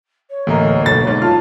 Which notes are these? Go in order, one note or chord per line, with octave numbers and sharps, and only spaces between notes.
C#5
A1 D2 A#3 A#4 D#5
B1 A4 A6
G#2
F4 A5 F6